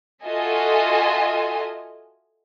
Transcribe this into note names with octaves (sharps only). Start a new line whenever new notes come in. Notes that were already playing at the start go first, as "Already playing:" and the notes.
F4 F#4 A4 D#5 E5 G#5